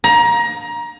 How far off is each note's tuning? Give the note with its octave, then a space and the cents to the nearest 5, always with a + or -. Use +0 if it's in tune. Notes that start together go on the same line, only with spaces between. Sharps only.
A#5 +25